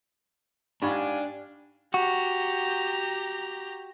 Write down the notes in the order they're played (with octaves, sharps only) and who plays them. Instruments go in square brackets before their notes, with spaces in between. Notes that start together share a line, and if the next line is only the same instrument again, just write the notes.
[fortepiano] G#2 B5 C#6 [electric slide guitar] D4 [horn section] G4 F5 G#5
[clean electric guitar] F#4 [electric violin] G4 A#5